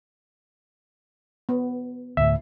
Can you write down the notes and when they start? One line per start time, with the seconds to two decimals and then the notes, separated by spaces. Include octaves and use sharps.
1.49 B3
2.17 D2 A2 E5